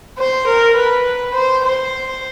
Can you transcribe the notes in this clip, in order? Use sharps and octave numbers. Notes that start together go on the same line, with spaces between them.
C5
A#4
B4
C5
C5